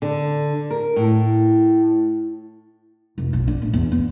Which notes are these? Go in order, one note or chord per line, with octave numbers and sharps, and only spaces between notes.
D3
A#4
A2
F1
B1
D4
A2
E2
B3